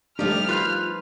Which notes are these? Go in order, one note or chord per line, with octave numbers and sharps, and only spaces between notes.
F3 G3 A3 D4 D#4 G4 F6
F4 B4 F5 F#6 G6